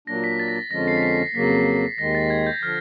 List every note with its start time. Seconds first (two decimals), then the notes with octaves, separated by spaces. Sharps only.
0.07 A#2 F#3 A#3 D4 A#6
0.24 B6
0.40 A6
0.48 A#6
0.56 A6
0.71 F2 D3 F3 G#3 C#4 A#6
0.88 C7
0.97 B6
1.03 C7
1.35 F2 C#3 F#3 A#3 B6
1.98 D#2 D#3 G#3 A#6
2.15 A6
2.30 G#6
2.46 G6
2.63 D3 F3 F6